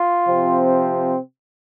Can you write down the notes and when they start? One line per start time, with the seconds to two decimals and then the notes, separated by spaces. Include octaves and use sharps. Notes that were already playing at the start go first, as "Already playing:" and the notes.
Already playing: F4
0.25 C3 F3 C4